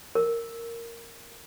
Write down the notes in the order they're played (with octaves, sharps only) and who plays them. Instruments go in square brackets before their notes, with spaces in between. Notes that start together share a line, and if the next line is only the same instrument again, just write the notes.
[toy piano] A#4